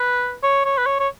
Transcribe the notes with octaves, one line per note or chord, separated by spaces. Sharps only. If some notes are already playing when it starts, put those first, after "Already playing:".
Already playing: B4
C#5
C#5
B4
C#5
C#5